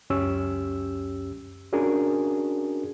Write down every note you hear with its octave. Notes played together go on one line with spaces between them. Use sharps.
C#2 F#2 C#4 G4 E6
C#4 D4 F#4 G#4 A#4